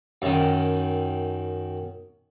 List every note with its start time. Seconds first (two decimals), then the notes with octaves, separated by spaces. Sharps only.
0.22 F#2 D#3